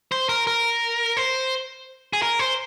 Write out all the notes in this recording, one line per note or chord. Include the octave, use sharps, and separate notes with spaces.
C5
A#4
A#4
C5
G#4
A#4
C5